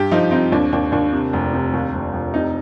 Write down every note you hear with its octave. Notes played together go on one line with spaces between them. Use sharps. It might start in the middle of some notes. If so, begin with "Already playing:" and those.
Already playing: G2 G4
F3 D#4
C4 D#4
D#2 D4
D#2 D4
D#2 D4
C3
F1
C3
D#2
F1
F1
C3 D#4